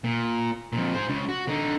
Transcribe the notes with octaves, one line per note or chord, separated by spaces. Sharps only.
A#2
F2 A#2
G#4 C5
C#2 C#3
F#4
D3 D#4